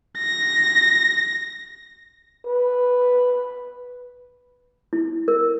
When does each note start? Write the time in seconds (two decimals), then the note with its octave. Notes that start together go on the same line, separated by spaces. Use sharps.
0.19 A#6
2.47 B4
4.93 E4
5.28 A#4